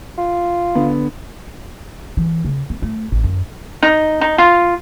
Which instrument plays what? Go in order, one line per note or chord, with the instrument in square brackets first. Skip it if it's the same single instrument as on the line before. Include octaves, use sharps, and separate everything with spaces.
[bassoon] F4
[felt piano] D3 B3
[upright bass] E3
C#3
B3
A3
A1
F#2
[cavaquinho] D#4
D#4
F4